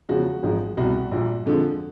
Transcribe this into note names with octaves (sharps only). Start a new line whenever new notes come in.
E2 C#3 F3 G#3 F#4
G#1 G#2 F3 G#3
C2 B2 G3 F#4
A#1 A#2 G3
F2 D3 F3 G#3